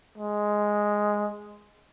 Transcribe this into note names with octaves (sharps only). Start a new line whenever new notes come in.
G#3